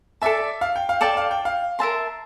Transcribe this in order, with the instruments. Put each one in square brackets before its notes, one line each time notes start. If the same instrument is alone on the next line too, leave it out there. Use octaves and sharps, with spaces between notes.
[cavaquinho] A4 D5 A5 [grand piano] E5
[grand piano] F5
G5
F5
[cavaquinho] A4 D5 A5 [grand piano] G5
[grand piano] F5
G5
F5
[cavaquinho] A#4 E5 A5 C6